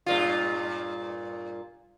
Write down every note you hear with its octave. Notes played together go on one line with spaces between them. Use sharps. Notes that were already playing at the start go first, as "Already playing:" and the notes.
G2 A#2 F4